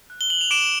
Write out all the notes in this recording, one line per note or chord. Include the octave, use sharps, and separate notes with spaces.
F#6
G7
F#7
F7
D6 D7 E7